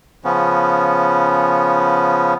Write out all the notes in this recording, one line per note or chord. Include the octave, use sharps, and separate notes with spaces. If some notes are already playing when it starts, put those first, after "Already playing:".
C#3 F3 B3 C#4